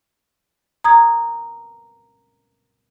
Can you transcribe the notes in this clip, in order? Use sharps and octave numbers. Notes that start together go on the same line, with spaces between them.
A#5 D#6 G#6